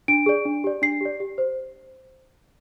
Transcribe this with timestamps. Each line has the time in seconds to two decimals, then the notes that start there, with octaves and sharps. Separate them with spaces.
0.08 D4 D7
0.26 G#4 D5
0.45 D4
0.64 G4 D5
0.82 D4 C7
1.01 G4 D5
1.20 G4
1.38 C5